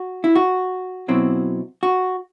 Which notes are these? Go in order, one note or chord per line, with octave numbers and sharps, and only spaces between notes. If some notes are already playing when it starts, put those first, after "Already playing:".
Already playing: F#4
E4
F#4
B2 F#3 C4 E4
F#4